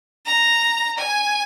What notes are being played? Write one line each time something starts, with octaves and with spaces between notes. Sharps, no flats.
A#5
G#5